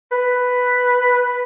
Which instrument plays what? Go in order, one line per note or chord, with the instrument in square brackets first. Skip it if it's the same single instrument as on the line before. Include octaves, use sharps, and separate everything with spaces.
[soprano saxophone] B4